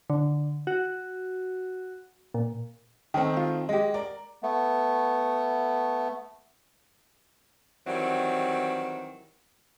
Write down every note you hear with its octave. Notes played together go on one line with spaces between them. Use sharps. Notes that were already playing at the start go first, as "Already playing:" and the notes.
D3
F#4
A#2
D#3 A3 C4
D#4 F4
G#3 G4 D#5
A#4 D5
A3 B3
D#3 E3 F#3 G3 C4